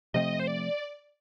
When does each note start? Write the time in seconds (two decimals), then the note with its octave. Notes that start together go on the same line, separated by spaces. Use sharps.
0.14 C3 F3 A3 C4 D#5
0.39 C5
0.47 D5